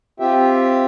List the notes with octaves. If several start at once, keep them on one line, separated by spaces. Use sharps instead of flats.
C4 F4 G4 E5 G5